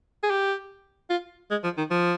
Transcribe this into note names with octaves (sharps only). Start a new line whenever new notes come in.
G#4
G4
F4
G#3
F3
D#3
F3